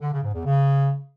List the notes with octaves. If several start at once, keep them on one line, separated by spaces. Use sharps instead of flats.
D3
C#3
G#2
E2
C#3